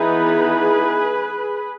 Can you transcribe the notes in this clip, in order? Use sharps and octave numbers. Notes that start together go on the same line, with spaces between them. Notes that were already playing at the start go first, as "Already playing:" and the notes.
Already playing: E3 B3 D#4 G#4 B4